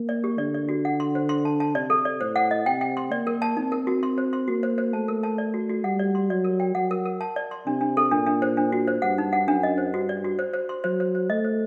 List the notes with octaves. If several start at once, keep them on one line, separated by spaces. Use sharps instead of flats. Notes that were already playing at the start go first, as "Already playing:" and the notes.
Already playing: A#3
D5
G4
D3 D5
D5
F#4
F#5
C6
C5
C6
A5
A5
C3 D5
A4
D5
A2 C5
F#5
D#5
C3 G5
G5
C6
A#3 D5
A#4
A5
C4 D#4
A#4
F#4
C6
C5
C6
A#3 F#4
C5
C5
A3 A5
A#4
A5
D5
F#4
F#4
G3 F#5
D5
C6
F#3 D5
A#4
G5
F#3 F#5
A#4
A#4
A5
D5
C6
C3 D4
D4
A4
A#2 D4
D4
C5
D4
F#4
C5
G2 F#5
D#4
F#5
F#2 D4
D#5
C5
G2 F#4
D5
F#4
C5
C5
C6
F#3 C5
C5
C5
A3 D#5
C5